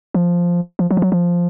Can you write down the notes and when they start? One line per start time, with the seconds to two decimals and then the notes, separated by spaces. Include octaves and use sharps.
0.14 F3
0.79 F3
0.91 F#3
0.97 F3
1.02 F#3
1.12 F3